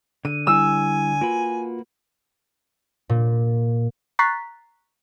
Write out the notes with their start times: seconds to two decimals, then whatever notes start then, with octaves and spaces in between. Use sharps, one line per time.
0.25 D3 D#7
0.47 G3 E4 G#5 E6
1.21 A#3 F4 F#4 B4
3.09 A#2
4.19 A#5 C#6 F#6 A6 B6 C7